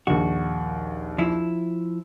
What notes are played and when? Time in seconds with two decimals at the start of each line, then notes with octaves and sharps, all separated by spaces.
0.07 A#1 D#2 F#4
1.18 F3 E4